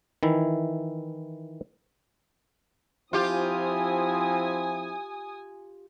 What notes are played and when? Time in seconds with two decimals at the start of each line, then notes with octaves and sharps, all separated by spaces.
0.23 D#3 E3 E4
3.13 F3 C4 E4 F4 G4 G#5 D#6